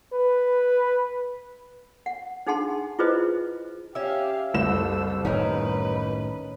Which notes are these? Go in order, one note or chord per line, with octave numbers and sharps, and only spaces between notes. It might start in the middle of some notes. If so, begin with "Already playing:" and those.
B4
F#5
D4 D#4 G#4 F#5 A5 C6
E4 F4 G#4 B4 C5 D#5
C#4 G4 E5 F5
F#1 C2 A4 E6 E7
A2 D#3 C#4 D#4 A#4 B4